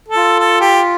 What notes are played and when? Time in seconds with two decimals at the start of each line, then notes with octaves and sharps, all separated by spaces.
0.08 A4
0.16 F4
0.39 A4
0.61 G4